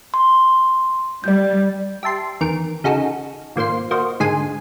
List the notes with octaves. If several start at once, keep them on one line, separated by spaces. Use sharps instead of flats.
C6
G3 D5 G6
G4 E5 A5 C6
E2 D#3 A#4 D7
C#3 D#4 F#4 G#4 A4
G#1 A#2 A#3 C5 C7
A#3 F#4 C5 D#5
G#2 D3 G#4 G#5 C6